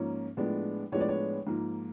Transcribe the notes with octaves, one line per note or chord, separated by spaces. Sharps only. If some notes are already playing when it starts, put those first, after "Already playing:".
Already playing: G#2 F3 A#3 C#4
A2 F3 G#3 B3 D4
A2 F3 G#3 B3 D4 C#5
D5
C#5
G#2 F3 A#3